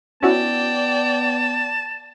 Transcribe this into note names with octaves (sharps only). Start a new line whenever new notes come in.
B3 C#4 E4 F#4 D5 G5 A5